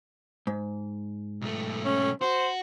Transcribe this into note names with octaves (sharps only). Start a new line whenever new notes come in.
G#2
B1 A3
C#4
F#4 C5